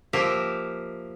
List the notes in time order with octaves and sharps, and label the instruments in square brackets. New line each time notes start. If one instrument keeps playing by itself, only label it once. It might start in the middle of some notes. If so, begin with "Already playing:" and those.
[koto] F3 A#3 G4 A#4 E5